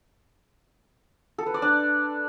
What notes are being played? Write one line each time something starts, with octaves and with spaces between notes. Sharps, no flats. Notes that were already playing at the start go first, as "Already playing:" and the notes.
A4
B4
D5
D4